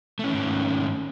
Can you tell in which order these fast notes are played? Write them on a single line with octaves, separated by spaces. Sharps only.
A3 C#4 D#3 G#2